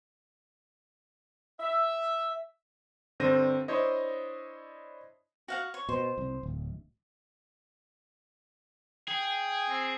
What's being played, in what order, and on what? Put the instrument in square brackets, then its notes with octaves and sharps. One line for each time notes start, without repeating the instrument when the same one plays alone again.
[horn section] E5
[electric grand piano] G2 D3 C4 C5 A#6 D#7
D4 E4 C5 C#5 D#5
[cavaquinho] F#4 F5 F#5
C#5
[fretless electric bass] B2 [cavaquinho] C5
[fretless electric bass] C2
D1
[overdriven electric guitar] G#4 [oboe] G5
[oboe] C4